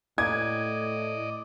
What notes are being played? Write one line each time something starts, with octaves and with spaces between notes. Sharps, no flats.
A2 D5 D#5 G#6